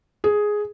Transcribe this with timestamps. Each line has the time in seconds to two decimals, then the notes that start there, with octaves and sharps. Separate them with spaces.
0.24 G#4